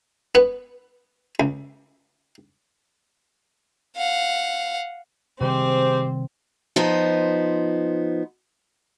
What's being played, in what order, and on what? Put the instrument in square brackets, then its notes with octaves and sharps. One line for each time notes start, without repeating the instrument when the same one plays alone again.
[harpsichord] B3 B4
C#2
[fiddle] F5 F#5
[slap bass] C3 D#3 G3 [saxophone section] G#3 G4 C5 [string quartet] C4
[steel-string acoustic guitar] F3 B3 D#4 C5